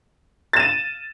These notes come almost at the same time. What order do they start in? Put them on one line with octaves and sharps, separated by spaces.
A6 E7 D#7